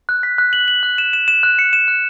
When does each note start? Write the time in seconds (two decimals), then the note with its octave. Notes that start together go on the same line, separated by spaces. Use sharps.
0.09 F#6
0.23 B6
0.38 F#6
0.53 F#7
0.68 F#7
0.83 F#6
0.98 E7
1.13 E7
1.28 E7
1.43 F#6
1.59 C#7
1.73 E7
1.88 F#6